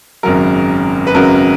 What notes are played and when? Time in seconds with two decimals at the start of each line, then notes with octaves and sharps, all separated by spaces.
0.23 G#1 F#2 C#3 F#3 A#4
1.07 B4
1.14 G#1 F#2 C#3 F#3 A#4